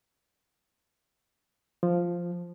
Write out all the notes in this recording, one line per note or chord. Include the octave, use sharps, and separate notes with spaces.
F3